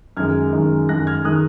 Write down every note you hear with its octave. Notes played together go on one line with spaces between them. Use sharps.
F#2 D#3 G#3 F6 G#6
F#2 D#3 G#3
F#2 D#3 G#3 F#6 A#6
F6 G#6
D#3 G#3 D#6 F#6